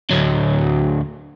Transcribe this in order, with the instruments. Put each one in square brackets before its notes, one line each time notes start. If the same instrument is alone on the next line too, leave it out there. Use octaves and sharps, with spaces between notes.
[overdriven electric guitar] D2 F#3